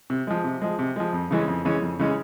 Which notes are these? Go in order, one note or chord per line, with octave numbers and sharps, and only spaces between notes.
C3
F3 G#3
C3
F3 G#3
C3
F3 G#3
F2
C#3 E3 G#3 C#4
F2
C#3 E3 G#3 C#4
F2
C#3 E3 G#3 C#4